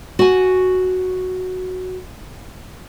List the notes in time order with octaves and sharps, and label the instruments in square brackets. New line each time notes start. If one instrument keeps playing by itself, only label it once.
[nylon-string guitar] F#4 G#5